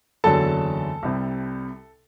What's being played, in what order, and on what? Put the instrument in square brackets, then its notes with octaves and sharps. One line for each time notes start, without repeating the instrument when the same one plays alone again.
[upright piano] F#1 E2 D3 F#3 A4 A5
C2 C3 G3